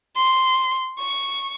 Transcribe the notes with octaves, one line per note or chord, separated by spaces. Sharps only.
C6
C#6